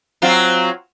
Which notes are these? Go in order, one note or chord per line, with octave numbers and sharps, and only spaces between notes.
F#3 C4 F4